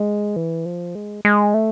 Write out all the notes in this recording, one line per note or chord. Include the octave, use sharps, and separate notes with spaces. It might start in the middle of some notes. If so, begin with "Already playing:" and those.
Already playing: G#3
E3
F3
G#3
G#3
A3